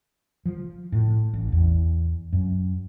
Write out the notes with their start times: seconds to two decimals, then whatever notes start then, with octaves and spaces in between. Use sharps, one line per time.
0.46 F3
0.92 A2
1.33 A1
1.52 E2
2.33 F#2